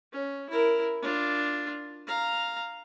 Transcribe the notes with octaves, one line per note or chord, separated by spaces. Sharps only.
C#4
E4 A#4
D4 F4
F5 A#5